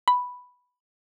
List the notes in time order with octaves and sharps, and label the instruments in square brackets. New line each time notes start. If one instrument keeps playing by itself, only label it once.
[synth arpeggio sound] B5